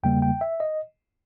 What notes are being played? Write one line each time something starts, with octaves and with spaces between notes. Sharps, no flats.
E2 C#3 G3 A#3 G5
G5
E5
D#5